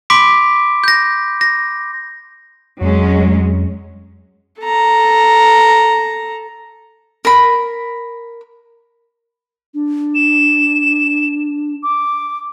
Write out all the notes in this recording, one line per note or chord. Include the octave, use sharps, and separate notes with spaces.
B5 C6 D6 B6 D7
G6 A#6
A#6
F2 F#3 G#3 C#4
A4 A#5
A#4 B5
D4
E7
D6